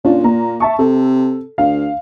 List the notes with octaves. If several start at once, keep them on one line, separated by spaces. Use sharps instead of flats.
A#2 C#4 D4 F4
A#3 A#5
E5 A5 C#6
C3 A4
D2 F5